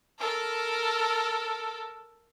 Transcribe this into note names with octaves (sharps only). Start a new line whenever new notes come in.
A4 A#4